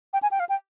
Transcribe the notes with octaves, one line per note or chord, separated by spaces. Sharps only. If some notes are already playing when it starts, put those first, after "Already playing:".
G5
G#5
G5
F5
G5